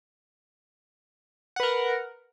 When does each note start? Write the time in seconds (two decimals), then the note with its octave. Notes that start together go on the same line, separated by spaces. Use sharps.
1.56 F#5
1.60 B4
1.63 A#4